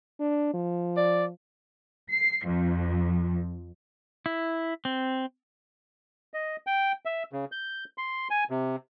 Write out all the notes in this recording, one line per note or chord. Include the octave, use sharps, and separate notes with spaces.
D4
F3
D5
C7
F2
E4
C4
D#5
G5
E5
C#3
G6
C6
G#5
C3